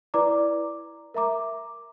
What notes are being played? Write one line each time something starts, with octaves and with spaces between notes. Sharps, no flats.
E4 B4 D5 A#5 D6
A#4 E5 A#5 D6